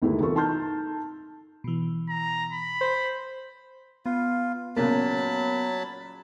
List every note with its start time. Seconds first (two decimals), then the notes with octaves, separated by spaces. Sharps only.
0.02 G1 D#2 G#3 A3 B3 E4
0.20 C2 E3 F4 A4 C#6
0.35 D#4 A5 C6 F6 G6
1.64 B2 E3
2.09 A#5
2.52 B5
2.81 C5
4.06 B3 F4
4.76 A#2 C#3 F#3 A#3 B3 A#4 A5 B5